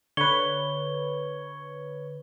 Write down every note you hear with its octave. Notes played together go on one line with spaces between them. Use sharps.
D3 B4 C#5 G7